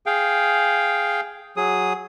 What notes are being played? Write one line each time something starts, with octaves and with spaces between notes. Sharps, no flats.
G#4 F5 G5
F#3 G#4 D#6